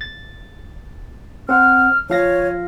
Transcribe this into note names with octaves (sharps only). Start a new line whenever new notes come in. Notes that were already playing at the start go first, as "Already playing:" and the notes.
A6
C4 F#5 F6
F3 C#5 F5 A#6